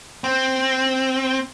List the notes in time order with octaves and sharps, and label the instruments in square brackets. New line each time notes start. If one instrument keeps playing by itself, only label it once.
[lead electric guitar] C4